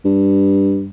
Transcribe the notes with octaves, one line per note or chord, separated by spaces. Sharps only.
G2